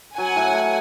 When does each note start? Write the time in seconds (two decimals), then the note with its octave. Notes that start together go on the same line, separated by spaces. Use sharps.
0.18 F#3 F#5 G#5
0.36 A2
0.53 A2